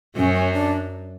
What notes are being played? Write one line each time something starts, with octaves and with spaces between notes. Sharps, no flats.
F#2 F#3 C#4
C#4
D4